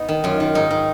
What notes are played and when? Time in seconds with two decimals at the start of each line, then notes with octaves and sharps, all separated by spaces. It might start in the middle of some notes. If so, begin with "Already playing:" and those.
Already playing: B3 D#4
0.08 D#3
0.24 F#2 F4
0.40 D#3
0.55 G#2 D#4
0.71 D#3